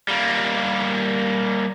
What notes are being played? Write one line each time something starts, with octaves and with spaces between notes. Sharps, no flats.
G3 A#3